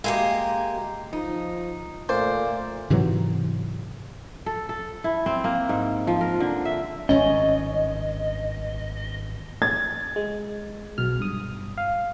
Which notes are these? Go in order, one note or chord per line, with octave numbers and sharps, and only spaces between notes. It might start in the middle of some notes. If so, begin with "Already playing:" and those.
G#3 A#3 G4
F3 D#4
A#2 A3 C5 D5
G#2 C3 E3 F#3
A4
A4
E4
C4
A#3
G#2
F3
A#4
D3
E5
G#1 G2 C#4 D#5
G#6 A6
G#3
B1 B2 F6
G2 D#6
F5